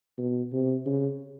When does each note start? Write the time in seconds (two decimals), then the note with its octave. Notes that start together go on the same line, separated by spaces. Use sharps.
0.18 B2
0.53 C3
0.86 C#3